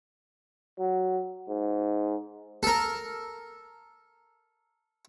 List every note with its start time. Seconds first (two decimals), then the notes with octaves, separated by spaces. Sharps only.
0.79 F#3
1.48 G#2
2.63 A4 A#4